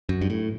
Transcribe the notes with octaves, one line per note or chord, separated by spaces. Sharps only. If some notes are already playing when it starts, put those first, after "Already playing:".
F#2
G2
A2